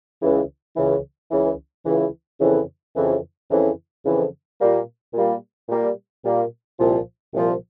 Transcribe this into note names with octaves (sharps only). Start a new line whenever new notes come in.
C#2 C#3 E3
C#2 C#3 E3
C#2 C#3 E3
C#2 C#3 E3
F2 C#3 E3
F2 C#3 E3
F2 C#3 E3
F2 C#3 E3
A#2 G3 A#3
A#2 G3 A#3
A#2 G3 A#3
A#2 G3 A#3
C2 A#2 F3
C2 A#2 F3